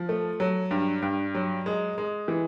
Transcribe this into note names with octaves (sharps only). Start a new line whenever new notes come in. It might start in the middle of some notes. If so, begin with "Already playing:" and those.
Already playing: F3
A3
F#3
G2
G2
F#3
G#3
G#3
E3